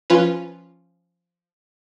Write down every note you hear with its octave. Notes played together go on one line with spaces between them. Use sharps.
F3 C#4 F4 B4